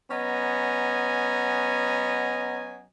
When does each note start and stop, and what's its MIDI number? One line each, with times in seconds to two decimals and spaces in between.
0.10 2.84 54
0.10 2.84 59
0.10 2.84 61
0.10 2.84 75
0.10 2.84 80
0.10 2.84 82